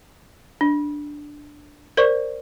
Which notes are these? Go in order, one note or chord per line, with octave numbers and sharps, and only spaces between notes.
D4
A#4 C5 D5 C#6